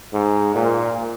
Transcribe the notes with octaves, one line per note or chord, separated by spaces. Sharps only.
G#2
A#2